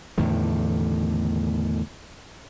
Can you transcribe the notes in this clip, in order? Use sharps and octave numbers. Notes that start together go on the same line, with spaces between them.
E2 A2 D3 D#3